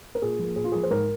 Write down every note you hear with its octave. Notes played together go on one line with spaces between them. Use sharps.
A#4
A#2 G#4
F3 A#3
A#2 G#4
F4
F3 A#3 G#4
C5
G#2 A#4